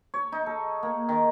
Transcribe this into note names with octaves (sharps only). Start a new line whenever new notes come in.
C#5
D#4
A4
A#3
D#3